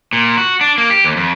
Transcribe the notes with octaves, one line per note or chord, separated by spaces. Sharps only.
A#2
F#4
D4
A#3
G4
D#2
F2